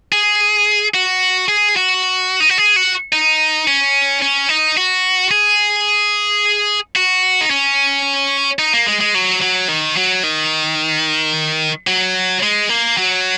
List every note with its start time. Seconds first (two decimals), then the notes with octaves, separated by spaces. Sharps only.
0.12 G#4
0.94 F#4
1.48 G#4
1.76 F#4
2.40 D#4
2.49 F#4
2.58 G#4
2.76 F#4
3.13 D#4
3.68 C#4
4.22 C#4
4.49 D#4
4.77 F#4
5.31 G#4
6.96 F#4
7.41 D#4
7.50 C#4
8.59 D#4
8.73 A#3
8.86 G#3
9.01 G#3
9.15 F#3
9.42 F#3
9.68 D#3
9.96 F#3
10.23 D#3
11.87 F#3
12.43 G#3
12.69 A#3
12.97 F#3